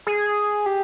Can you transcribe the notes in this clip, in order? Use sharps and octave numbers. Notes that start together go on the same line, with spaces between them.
G#4
G4